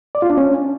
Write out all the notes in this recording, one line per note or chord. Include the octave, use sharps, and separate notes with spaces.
D5
F4
D4
C#4